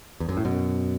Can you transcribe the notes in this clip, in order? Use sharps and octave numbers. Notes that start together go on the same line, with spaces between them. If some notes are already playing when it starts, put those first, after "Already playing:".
E2
F#2
A2
F#2 B2